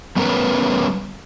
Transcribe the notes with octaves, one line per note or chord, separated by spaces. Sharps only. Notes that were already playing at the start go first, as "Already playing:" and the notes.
G3 B3 C#4 A#4 B4